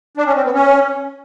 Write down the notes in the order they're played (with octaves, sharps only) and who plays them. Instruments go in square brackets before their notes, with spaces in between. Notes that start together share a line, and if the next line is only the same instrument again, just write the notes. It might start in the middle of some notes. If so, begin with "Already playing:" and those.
[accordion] D4
C#4
C4
B3
C#4